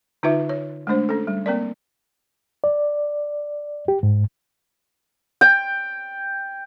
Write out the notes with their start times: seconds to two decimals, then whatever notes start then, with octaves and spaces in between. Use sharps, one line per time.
0.23 D3 D#4 F4 B4 E5
0.49 C#5
0.87 G#3 A3 D4 C5
1.09 C#4 A4
1.27 G3
1.46 A#3 C4 A#4 D5
2.64 D5
3.88 G4
4.03 G#2
5.41 G5